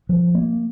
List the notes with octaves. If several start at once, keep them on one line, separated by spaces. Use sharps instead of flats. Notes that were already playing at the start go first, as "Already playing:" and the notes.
F3
A#3